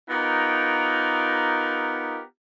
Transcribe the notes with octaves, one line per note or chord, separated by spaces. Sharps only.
B3 D#4 F4 G4 A#4